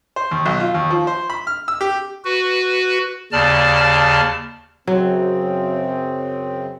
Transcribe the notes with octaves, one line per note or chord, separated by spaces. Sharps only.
C5
D#2
B1
F4
D#2
F3
C5
B5
F6
E6
G4
F#4 B4
D#2 C#3 D5 A5 F6
F#2 C#3 F#3 C4